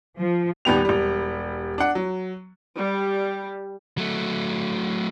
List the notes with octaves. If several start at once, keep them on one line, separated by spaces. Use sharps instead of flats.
F3
D#1 D#2 G3 B3 G4 F7
E1 G3
D4 F#5
F#3
G3
F#3 A3